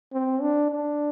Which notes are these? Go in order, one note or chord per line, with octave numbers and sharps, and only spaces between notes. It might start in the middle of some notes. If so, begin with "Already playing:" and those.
C4
D4
D4